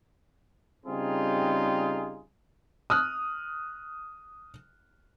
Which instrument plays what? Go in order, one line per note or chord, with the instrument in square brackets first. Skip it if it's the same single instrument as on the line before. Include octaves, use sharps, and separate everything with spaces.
[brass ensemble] C#3 G3 C4 D#4 F4 G#4
[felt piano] D#6 F6 F#6